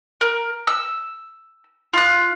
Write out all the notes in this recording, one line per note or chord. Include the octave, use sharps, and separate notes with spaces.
A#4
E6
F4 F#6